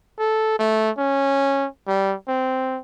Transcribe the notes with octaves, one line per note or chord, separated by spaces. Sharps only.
A4
A3
C#4
G3
C4